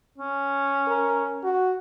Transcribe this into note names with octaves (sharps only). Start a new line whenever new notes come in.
C#4
A#4
F#4